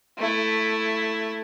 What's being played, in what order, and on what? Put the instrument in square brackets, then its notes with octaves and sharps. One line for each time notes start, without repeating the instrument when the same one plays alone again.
[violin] A3 E4